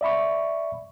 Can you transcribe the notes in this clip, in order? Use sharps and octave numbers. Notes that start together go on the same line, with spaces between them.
D5 E5 B5 C#6